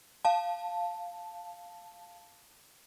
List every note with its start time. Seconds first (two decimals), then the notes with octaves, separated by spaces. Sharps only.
0.25 F5 A5